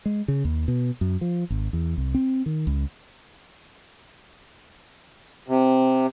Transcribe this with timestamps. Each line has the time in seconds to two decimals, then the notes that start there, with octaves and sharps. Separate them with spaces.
0.06 G#3
0.28 C#3
0.45 D#2
0.68 B2
1.01 F#2
1.21 F3
1.50 G#1
1.73 E2
1.98 C2
2.15 C4
2.46 D#3
2.67 C#2
5.48 C3